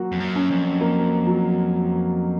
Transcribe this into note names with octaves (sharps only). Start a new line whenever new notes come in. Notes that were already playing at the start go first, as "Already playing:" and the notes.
Already playing: F#3 A#3 F#4
F2
F#2
C#4
F2
A#3
F#3